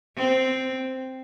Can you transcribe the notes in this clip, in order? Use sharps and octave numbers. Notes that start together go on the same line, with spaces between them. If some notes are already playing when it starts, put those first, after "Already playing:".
C4